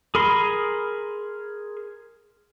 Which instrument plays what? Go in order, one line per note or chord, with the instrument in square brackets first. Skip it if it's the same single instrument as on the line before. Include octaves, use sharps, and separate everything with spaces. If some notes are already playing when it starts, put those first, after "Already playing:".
[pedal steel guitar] G#4 A#4 B5 C6